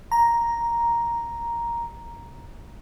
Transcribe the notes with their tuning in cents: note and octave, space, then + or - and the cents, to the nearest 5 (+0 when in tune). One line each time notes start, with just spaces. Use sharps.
A#5 +5